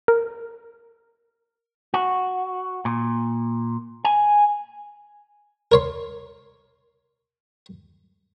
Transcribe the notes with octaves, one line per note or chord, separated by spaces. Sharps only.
A#4
F#4
A#2
G#5
A#4 C#5 C6